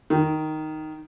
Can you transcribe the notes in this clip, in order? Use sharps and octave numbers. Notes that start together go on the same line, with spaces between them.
D#3